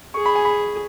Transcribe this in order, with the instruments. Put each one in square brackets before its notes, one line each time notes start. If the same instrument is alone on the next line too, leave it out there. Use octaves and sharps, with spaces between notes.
[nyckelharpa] G#4 [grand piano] C#6
[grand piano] B5
G#5
B5